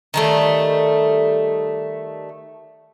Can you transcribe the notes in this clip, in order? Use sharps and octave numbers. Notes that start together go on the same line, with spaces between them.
D#3 G3 A3